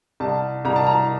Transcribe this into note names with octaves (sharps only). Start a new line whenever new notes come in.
C2 A5
C2 A#5
A5
A#5